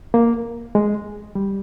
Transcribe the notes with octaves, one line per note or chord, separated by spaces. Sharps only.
A#3
G#3
G3